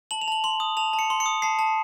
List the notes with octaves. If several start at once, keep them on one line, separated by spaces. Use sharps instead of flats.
A5 F#7
F7
A5 F#7
C6 F#7
D#6
A5 F7
A5
C#7
C6
C#7
D#6
A5 C7
A5